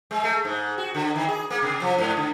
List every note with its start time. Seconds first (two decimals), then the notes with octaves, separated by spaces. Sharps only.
0.11 G#3
0.23 A3
0.45 G#2
0.78 F#4
0.94 D3
1.16 D#3
1.28 G#4
1.50 A#3
1.62 C3
1.82 F3
1.98 G#2
2.17 D3